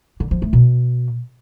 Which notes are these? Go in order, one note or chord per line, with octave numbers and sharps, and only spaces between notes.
D3
F3
A3
B2